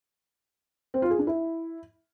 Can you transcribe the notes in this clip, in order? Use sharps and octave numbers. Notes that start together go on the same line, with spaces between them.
C4
F4
G#4
D4
E4